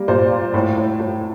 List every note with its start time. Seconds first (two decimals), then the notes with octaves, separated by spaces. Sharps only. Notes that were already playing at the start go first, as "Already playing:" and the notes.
Already playing: G3 A#3
0.08 A#2 C5
0.31 A#3
0.54 A2
0.77 A2
1.00 A2